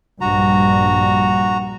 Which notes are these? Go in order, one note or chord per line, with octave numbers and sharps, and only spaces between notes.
A#1 G2 G3 F#4 A#5